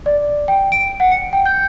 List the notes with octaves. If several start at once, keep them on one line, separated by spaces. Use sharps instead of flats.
D5
G5
D7
F#5
C#7
G5
G6